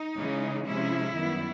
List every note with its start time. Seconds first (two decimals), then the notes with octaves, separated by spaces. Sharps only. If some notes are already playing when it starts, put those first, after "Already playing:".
Already playing: D#4
0.16 C#3 E3 G#3 C#4
0.65 C3 F3 G#3 C#4 E4
1.14 F#2 D#3 G3 B3